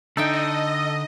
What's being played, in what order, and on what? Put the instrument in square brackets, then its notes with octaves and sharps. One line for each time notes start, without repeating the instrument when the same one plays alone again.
[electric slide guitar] D3 [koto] D#4 E5 G5 [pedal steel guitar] A4 [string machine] D#5